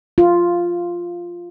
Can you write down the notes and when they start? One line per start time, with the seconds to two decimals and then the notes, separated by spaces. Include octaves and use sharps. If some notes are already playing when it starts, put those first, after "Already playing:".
0.18 F4